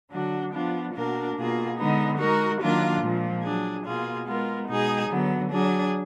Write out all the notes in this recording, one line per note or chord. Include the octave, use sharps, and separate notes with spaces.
D3 F#3 D4 F#4
F3 B3 D4 F4
B2 A#3 D4 F#4 A#4
B2 A#3 F4 G#4
D3 G#3 B3 D#4
G#3 D#4 F#4 A#4
D#3 F#3 A#3 D4 F4
A#2 F3 G#3
F#3 D4 G#4
B2 A#3 F4 G#4
G#3 B3 F4 A#4
B2 G#3 D#4 G#4
D3 F#3 B3
F#3 D4 G#4